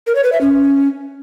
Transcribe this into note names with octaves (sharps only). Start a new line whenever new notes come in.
A#4
C#5
B4
E5
C#4